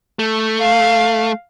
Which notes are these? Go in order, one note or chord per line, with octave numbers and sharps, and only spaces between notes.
A3
F5